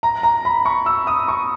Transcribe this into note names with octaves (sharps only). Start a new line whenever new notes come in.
A#5
A#5
B5
C#6
E6
D#6
C#6